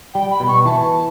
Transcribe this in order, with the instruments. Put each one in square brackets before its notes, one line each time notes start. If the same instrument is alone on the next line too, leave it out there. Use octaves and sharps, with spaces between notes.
[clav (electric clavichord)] G3 [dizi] G5
[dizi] B5
[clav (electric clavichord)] B2
[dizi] C#6
[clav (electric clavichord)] E3 [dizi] A5